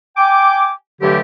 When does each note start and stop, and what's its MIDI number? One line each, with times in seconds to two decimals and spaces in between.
0.17 0.71 79
0.17 0.71 80
0.17 0.71 86
1.01 1.20 43
1.01 1.20 50
1.01 1.20 52
1.01 1.20 54
1.01 1.20 57
1.01 1.20 67